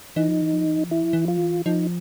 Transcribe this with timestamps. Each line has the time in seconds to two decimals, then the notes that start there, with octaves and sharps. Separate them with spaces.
0.16 E3 D#4
0.28 F3
0.42 E3
0.53 F3
0.65 E3
0.77 F3
0.89 E3 E4
1.02 F3
1.13 E3
1.26 F3 F4
1.37 E3
1.66 F3 D#4